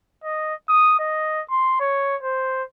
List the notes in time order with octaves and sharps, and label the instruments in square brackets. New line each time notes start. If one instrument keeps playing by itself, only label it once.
[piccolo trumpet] D#5
D#6
D#5
C6
C#5
C5